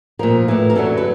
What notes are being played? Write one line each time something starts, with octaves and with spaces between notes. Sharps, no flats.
A#2 F3 A#4
A2 E3
A#4
F#2 D3 F#3 A4
B4